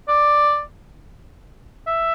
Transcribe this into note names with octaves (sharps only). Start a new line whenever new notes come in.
D5
E5